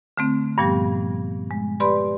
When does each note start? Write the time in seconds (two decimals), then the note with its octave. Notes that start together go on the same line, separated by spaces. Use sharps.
0.17 D3 A3 C4
0.58 G2 A#2 F3 G3 B3 G4
1.51 G#3
1.80 G4 B4 D5 B5 C6